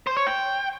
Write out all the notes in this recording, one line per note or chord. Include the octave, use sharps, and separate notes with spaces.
C5
C#5
G5